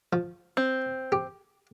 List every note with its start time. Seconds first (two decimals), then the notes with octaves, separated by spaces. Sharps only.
0.13 F3
0.57 C4
1.12 G4